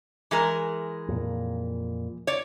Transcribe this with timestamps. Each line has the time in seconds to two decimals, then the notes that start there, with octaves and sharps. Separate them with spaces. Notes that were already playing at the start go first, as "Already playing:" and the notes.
0.31 E3 G#3 A#4
1.08 F2 A#2
2.27 C#5 D5